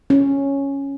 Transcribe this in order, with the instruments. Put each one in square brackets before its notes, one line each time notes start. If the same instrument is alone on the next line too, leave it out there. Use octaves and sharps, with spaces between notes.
[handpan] C#4